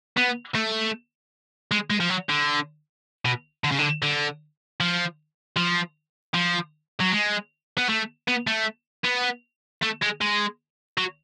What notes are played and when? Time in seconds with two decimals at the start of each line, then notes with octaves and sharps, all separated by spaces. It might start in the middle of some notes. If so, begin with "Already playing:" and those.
0.17 B3
0.55 A3
1.71 G#3
1.90 G#3
2.00 F3
2.10 F#3
2.29 D3
3.25 B2
3.64 D3
3.71 C#3
3.79 D3
4.02 D3
4.80 F3
5.57 F3
6.34 F3
7.00 F#3
7.12 G#3
7.77 B3
7.89 A3
8.28 B3
8.47 A3
9.05 B3
9.82 A3
10.02 G#3
10.21 G#3
10.97 F#3